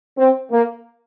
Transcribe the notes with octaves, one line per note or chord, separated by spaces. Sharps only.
C4
A#3